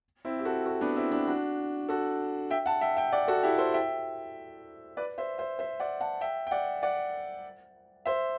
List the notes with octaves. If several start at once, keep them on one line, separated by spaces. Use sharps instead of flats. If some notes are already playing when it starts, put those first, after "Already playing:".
C4 E4
G4
F#4 A4
F#4 A4
B3 D4
C4 E4
B3 D4
D4 F#4
F#4 A4
E5 G5
F#5 A5
E5 G5
E5 G5
D5 F#5
F#4 A4
E4 G4
A4 C5
E5 G5
B4 D5
C5 E5
C5 E5
C5 E5
D5 F#5
F#5 A5
E5 G5
G5
D5 F#5
D5 F#5
C5 E5